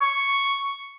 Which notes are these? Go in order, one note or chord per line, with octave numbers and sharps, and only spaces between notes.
C#6